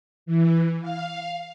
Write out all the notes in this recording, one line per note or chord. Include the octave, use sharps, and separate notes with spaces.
E3
F5